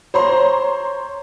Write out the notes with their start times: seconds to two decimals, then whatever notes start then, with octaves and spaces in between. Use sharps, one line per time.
0.14 C5 C#5 A#5 C6